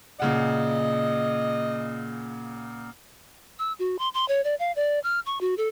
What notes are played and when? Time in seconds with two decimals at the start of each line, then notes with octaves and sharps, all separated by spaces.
0.20 A#2 C#3 D#5 F#5
3.59 E6
3.79 F#4
3.99 C6
4.14 C6
4.28 C#5
4.44 D5
4.59 F5
4.76 D5
5.04 F6
5.26 C#6
5.41 F#4
5.57 A4